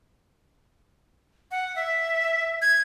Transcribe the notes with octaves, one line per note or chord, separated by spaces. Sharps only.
F#5
E5
G#6